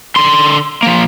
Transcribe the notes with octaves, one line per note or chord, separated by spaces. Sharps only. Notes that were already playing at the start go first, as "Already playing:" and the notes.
D3 C6
F3 A#3